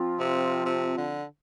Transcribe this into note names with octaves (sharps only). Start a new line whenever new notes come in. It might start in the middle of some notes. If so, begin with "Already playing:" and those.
Already playing: F3 C4 F4
C3
C3
D3